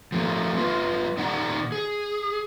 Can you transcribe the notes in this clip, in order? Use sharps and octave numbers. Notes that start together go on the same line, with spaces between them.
F3 A3 A#3
G3 F4 B4
A#2 D#3 D5 F#5 A#5
G#4